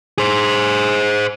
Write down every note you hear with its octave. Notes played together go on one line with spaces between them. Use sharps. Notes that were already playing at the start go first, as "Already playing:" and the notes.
G#4 C5